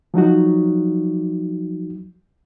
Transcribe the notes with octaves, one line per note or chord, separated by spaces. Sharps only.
F3 F#3 D#4 F#4